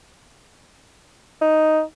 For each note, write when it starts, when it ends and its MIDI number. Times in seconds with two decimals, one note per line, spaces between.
1.41 1.81 63